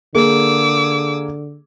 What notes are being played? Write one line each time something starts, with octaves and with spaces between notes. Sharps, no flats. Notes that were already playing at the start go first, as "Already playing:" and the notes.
D3 A#3 G#4 D6 E6